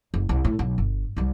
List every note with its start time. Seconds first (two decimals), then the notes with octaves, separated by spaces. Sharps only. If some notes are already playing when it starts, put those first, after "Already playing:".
0.14 F#1
0.29 C2
0.45 A2
0.59 B1
0.78 G1
1.16 C2 G3